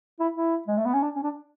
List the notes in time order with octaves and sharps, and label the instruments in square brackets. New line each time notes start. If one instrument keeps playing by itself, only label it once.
[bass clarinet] E4
E4
G#3
A3
B3
C#4
D4
C#4
D4